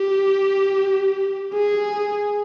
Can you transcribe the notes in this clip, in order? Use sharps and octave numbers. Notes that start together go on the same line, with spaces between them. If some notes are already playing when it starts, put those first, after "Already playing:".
Already playing: G4
G#4